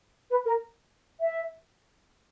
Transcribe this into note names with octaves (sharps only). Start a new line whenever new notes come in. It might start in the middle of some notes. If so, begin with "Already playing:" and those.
B4
A#4
E5